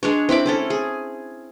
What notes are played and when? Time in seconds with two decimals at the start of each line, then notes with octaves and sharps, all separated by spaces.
0.03 G#3 D4 C#5
0.29 C4 E4 B5 D6
0.46 C4 C#4 A4
0.70 G#4